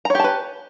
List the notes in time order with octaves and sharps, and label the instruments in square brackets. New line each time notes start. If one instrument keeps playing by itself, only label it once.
[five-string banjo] A#5
C#5
G4
A5
B4